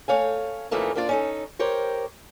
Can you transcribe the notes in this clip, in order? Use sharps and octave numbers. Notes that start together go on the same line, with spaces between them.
A3 C#5 F5 G#5
F2 C#3 E3 A3 A#3 D#4
A#3 C4 D4 F4 D5
C#4 D#4 A4
G4 A#4 C5 C#5